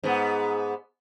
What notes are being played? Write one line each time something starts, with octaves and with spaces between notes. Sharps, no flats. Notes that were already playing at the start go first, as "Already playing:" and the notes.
G#2 B3